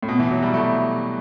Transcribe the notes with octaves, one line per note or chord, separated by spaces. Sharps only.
A2
B2
E3
F#3
G3
A3